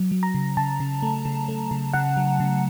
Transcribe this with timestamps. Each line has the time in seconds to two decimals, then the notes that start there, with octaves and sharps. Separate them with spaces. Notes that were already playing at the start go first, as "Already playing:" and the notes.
Already playing: F#3
0.11 F#3
0.23 A#5
0.34 C#3
0.57 C#3 A5
0.80 C#3
1.02 A3
1.25 C#3
1.48 A3
1.71 C#3
1.93 C#3 F#5
2.17 F#3
2.40 C#3